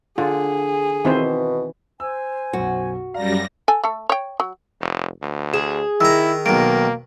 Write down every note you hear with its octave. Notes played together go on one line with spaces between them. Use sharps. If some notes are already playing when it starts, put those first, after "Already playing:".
D3 F4 G#4
B2 D#3 E3 C4 C5
C5 G#5 E6
B1 F#2 F#4
F#2 G3 D5 F5 A#5 A#6
A4 G#5
A3 A4
C#5 G5
F#3
F1
D2
G#4 E7
D#3 E4 A#5 E6
B1 D#3 A#3 D7